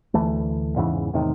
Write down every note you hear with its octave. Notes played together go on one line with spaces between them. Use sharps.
D2 E3 A3
E2 G#2 C#3 E3
E2 A2 C3 D#3